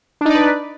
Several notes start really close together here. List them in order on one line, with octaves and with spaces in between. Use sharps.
D4 D#4 D5 B4